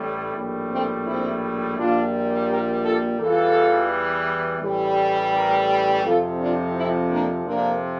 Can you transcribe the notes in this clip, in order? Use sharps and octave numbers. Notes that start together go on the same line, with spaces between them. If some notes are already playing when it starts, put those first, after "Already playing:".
Already playing: A1 A2 G3
A#1 A2 G3
A3 C4
C4 E4
A#1 A#2 G3 D4 F4
G4 A#4
F4 A4
E2 E3 G3 F4 A4
A1 A2 E3 G3
G4 A#4
F2 C3 F3 F4 A4
D4 F4
C4 E4
A#3 D4
F2 C3 F3 A#3 D4